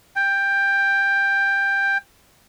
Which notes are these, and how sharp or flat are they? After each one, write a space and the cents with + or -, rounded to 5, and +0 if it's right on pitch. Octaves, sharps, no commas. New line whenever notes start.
G5 +15